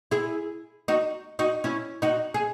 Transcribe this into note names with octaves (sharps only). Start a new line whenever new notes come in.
E4 G#4
D#4 F#4
D#4 F#4
C#4 E4
D#4 F#4
G#4